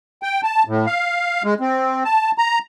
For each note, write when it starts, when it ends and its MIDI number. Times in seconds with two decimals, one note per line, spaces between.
0.23 0.41 79
0.43 0.63 81
0.67 0.86 45
0.86 1.42 77
1.44 1.54 56
1.60 2.04 60
2.05 2.31 81
2.38 2.59 82